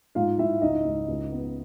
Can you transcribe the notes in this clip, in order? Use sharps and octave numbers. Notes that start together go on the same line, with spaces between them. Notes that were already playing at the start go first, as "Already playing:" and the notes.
G#2 F4 F5
G#2 E4 E5
C#2 D#4 D#5
C#2
C#2
B3